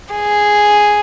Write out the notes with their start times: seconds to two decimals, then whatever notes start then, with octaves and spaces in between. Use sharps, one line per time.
0.14 G#4